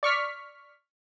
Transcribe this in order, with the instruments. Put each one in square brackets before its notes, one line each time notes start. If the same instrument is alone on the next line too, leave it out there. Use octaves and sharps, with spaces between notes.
[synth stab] D5 C#6 F6 B6